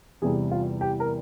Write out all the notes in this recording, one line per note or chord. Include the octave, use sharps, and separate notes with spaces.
E2 C3 G3 G#4
F4
G4
A#4